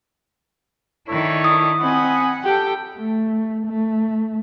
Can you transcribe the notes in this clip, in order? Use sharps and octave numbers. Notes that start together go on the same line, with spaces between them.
D#3 D4 E4 A4 C#5
D#6
C4 D#5 F#5 G#5 B5
G4 A4 G5
A3
A3